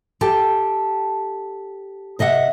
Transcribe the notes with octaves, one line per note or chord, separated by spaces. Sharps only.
G4 A4 G5 A5
C3 D#5 E5 F#5